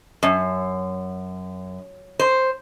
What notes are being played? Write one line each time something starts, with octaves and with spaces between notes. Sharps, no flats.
F#2
C5